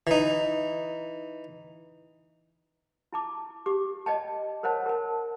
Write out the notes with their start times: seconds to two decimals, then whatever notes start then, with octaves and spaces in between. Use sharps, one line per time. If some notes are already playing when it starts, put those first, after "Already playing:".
0.07 E3 D#4
3.13 E4 A5 D6
3.66 G4 D6
4.06 D5 D#5 G5 A5
4.63 A#4 C5 C#5 F#5 A5
4.86 A#4 A5